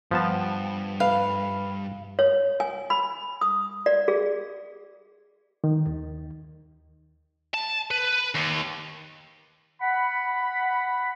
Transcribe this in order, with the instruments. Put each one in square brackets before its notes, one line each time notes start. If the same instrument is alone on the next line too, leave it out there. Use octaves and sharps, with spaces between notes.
[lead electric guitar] G2 [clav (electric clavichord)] F3 B3 A5
[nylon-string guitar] B4 [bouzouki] F5
[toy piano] C#5
G#5
B5
D#6
D5
G#4
[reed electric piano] D#3
D#2
[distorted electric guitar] A5
B4
D#2
[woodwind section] F#5 B5